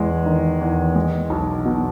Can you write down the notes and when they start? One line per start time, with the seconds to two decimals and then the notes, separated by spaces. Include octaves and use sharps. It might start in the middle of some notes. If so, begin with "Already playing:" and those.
Already playing: E2 G#3
0.26 D#3
0.61 E2
0.96 G#3
1.30 B1
1.65 B2